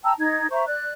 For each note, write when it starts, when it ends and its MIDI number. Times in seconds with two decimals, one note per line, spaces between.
0.04 0.13 79
0.04 0.13 81
0.04 0.13 82
0.04 0.13 88
0.18 0.46 63
0.18 0.46 92
0.51 0.64 72
0.51 0.64 76
0.51 0.64 82
0.51 0.64 85
0.66 0.92 74
0.66 0.92 90